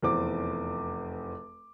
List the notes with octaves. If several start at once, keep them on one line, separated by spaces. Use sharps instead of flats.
F1 E2 C5 D6